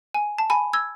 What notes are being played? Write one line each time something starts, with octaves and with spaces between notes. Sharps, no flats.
G#5
A5
G#5 B5
E6 G#6